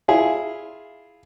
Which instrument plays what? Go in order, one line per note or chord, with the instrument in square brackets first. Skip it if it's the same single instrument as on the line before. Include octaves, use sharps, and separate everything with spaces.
[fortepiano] E4 F4 G#4